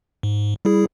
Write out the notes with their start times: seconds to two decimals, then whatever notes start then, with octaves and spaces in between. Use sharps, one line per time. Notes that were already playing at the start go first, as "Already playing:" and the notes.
0.23 G#2
0.65 G3 E4 G#4